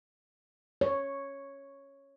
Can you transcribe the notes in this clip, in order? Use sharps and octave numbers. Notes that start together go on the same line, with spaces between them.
C#5